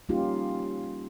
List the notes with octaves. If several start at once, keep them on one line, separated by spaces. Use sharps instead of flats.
G3 A#3 C#4 D#4 F4 G4